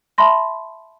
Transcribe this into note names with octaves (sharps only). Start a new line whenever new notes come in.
E5 A5 B5 C6 A#6